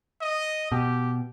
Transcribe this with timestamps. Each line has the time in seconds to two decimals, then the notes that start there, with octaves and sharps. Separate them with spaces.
0.21 D#5
0.72 B2 G4